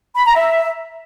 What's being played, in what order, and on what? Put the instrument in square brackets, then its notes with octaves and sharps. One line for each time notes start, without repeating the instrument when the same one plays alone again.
[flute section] B5
A#5
E5